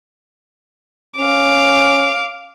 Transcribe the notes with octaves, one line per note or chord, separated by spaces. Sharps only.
C#4 F5 D6